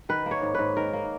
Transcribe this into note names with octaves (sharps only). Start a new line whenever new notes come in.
D#3 B4
A#3
C#5
G#2
G#2 B4
D#3 A#4
A#3